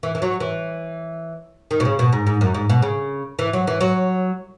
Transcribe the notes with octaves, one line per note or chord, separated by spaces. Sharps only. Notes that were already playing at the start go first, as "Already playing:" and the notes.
E3
E3
F#3
E3
D#3
B2
C#3
B2
G#2
G#2
F#2
G#2
B2
C#3
E3
F#3
E3
F#3